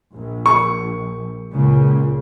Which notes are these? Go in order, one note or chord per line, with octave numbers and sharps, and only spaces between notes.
A#1
C#6
C#2 A#2 C#3